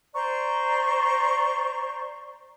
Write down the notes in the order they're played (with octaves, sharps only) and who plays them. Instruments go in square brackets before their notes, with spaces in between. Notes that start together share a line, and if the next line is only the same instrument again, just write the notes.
[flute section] C5 D5 A#5 C#6